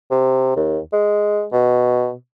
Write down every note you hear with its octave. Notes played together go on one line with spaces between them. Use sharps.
C3
D#2
G#3
B2